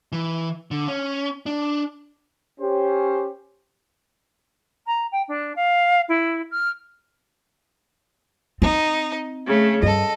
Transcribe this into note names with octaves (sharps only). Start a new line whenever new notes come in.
E3
D3
C#4
D4
C#4 G4 C5
A#5
G5
D4
F5
E4
F6
C4 D#4
C#3 A3
G2 A4 D#5